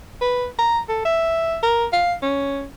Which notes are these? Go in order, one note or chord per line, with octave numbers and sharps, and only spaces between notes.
B4
A#5
A4
E5
A#4
F5
C#4